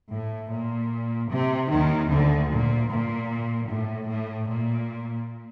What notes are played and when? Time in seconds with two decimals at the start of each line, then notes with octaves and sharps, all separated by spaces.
0.12 A2
0.52 A#2
1.30 C3
1.71 D#2 D#3
2.10 D2 D3
2.50 A#2
2.90 A#2
3.69 A2
4.09 A2
4.48 A#2